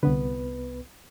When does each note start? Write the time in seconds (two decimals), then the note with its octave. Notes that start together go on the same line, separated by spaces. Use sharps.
0.03 C2 D3 B3 B4